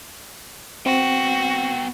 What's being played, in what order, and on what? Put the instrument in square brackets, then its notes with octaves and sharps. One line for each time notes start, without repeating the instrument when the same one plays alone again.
[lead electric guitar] B3 G5 [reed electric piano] C4 [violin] F#4